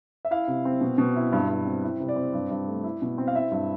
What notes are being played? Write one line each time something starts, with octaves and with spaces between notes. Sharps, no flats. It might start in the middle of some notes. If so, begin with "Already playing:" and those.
E5
E4 F5
C3
C4
B2
B2
E4
G2
G2
C4
E4
C3
D5
C4
G2
G2
A3
E4
B2
C4
F5
E4 E5
G2